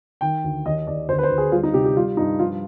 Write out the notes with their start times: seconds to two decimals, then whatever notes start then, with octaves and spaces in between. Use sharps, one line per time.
0.21 D#3 G5
0.44 D2
0.66 D#2 D#5
0.87 D#2 D5
1.08 D2 C5
1.18 B4
1.23 C5
1.30 D2
1.38 G#4
1.52 G3 F4
1.63 D#4
1.74 C3 G4
1.85 G4
1.96 G3 F4
2.17 G2 D#4
2.39 F3 F4